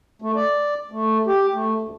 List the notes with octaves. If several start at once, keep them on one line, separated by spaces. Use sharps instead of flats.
A3
D5
A3
G4
A3
D2